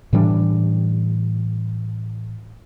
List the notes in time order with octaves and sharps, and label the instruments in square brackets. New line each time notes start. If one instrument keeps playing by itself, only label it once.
[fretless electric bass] A2 E3 G3 D4